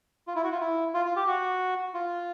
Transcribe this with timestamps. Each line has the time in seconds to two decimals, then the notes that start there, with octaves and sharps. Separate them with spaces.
0.27 F4
0.36 E4
0.44 F#4
0.52 F4
0.61 E4
0.94 F4
1.06 F4
1.16 G4
1.27 F#4
1.94 F4